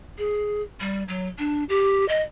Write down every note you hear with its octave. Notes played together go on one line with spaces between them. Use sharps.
G#4
G3
F#3
D4
G4
D#5